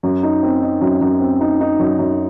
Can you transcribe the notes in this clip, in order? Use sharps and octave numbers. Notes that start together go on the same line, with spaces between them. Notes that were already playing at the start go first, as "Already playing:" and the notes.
F#2
D#4
C4
D#4
F#2
F#2
C4
D#4
D#4
F#2
F#2